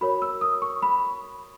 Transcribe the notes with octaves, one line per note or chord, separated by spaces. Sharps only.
F#4 A#4 C#5 B5
E6
D#6
C#6
B5